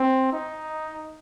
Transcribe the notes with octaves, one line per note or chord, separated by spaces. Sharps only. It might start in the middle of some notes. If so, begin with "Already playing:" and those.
Already playing: C4
D#4